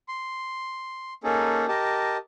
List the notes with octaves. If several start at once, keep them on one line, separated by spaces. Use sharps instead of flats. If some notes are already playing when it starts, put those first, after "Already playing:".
C6
A#3 C#4 D#4 G#4 A4
G4 A#4 D#5 A5